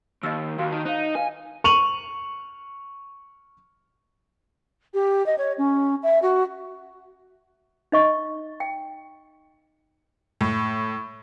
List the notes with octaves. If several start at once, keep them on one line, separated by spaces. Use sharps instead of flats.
D#2 D#5 E6
D#2 F#4 F5
D#3 A5
D#4 C5 F5
B4 F5 G#5
C#6 D#7 F7 F#7
G4
D#5
C#5
C#4
E5
F#4
D#4 D#5 C#6
G5
A2